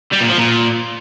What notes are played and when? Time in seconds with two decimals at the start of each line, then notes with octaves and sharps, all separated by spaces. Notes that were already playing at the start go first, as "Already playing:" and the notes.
0.13 G3
0.21 A#2
0.30 F3
0.38 A#2